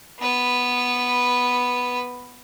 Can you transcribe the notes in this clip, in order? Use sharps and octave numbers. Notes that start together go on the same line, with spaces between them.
B3 B4